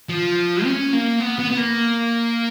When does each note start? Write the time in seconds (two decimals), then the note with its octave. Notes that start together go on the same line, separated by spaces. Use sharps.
0.09 F3
0.65 C#4
0.93 A#3
1.20 B3
1.39 B3
1.51 B3
1.57 A#3